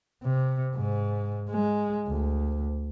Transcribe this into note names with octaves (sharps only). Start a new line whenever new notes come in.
C3
G#2
G#3
D2